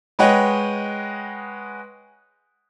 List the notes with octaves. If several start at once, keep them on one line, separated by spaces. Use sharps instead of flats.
G#3 B4 C#5 D#5 F#5 G5